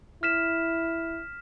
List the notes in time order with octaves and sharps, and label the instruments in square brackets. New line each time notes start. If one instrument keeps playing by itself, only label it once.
[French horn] E4 [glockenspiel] F6 B6 E7